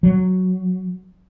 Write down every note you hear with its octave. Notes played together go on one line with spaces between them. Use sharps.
F#3